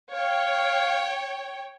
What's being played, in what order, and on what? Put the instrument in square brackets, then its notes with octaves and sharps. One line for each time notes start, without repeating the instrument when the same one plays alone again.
[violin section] C#5 G5 [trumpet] F5